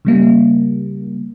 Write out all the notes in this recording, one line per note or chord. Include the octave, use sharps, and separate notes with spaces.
C#3 G3 A#3